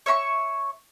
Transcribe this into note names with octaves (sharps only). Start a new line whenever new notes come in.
C#5 E5 B5 C#6